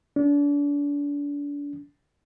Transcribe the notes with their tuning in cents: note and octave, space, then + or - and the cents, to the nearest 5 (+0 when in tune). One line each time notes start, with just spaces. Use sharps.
D4 -35